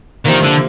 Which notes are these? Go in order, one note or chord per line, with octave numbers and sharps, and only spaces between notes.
C3 D#3 F3 A#3 D4
D3